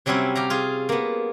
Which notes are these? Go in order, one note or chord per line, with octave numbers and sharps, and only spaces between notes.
C3 F#3 G3 C4 C#4 E4
G4 F5 A#5
F4 G#4
A#3 B3